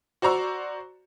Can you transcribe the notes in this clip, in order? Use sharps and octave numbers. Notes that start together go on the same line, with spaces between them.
F#4 C5 D5 A#5 C#6 E6